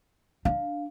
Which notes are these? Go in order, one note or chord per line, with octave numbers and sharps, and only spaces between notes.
D4 F5